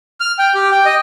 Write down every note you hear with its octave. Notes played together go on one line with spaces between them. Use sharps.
F6
G5
G4
G5
D#5